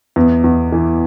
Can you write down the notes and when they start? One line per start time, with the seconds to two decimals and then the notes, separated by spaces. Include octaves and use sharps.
0.16 E2
0.44 E2
0.72 E3